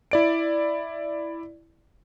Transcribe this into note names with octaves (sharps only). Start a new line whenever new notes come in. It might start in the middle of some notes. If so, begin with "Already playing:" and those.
E4 D5 D7